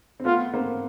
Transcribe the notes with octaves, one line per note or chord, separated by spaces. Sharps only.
C4
A3 B3 F4
A#3 C4